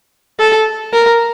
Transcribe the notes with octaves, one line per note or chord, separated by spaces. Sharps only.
A4
A#4